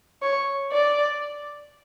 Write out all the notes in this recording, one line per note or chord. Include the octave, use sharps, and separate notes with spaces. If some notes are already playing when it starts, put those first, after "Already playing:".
C#5
D5